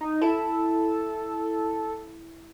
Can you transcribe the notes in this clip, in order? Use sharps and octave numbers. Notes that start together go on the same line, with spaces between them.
D#4
E4 A4